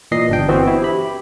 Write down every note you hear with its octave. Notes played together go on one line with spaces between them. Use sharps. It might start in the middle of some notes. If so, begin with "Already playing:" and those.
A#2 E3 D#5 C7
G1 D4 G5
E3 B3 C4 F#4
E4
G4 B5